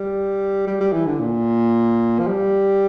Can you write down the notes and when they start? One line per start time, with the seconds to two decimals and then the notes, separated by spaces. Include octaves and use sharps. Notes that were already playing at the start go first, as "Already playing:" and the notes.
Already playing: G3
0.67 G3
0.80 G3
0.93 E3
1.06 D3
1.20 A#2
2.19 F3
2.27 G3